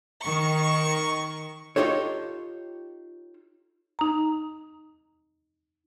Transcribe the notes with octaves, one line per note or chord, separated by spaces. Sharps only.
D#3 C#6
D#4 F4 G4 A4 C#5
D#4 A#5